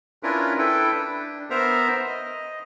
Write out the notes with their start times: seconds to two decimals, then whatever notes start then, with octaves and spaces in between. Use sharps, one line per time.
0.23 C#4 D4 E4 F4 A#4 B4
0.58 E4 A4 B4 G5
0.92 D4
1.50 B3 A#4 C5 E5 A#5
2.07 D#5